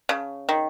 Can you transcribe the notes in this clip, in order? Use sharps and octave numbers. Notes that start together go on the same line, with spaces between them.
C#3
D#3